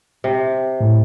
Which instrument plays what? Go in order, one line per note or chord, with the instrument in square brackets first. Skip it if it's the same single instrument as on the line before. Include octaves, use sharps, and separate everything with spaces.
[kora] C3
[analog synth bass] A2